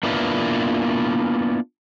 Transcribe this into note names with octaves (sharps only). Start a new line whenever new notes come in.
A#3 B3 D4 E4 F4 B4